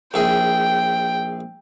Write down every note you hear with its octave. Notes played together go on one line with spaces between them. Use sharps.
A#1 E4 G#4 G5